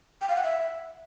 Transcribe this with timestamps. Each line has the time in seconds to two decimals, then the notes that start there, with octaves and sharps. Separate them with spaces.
0.21 G5
0.29 F5
0.36 F#5
0.43 E5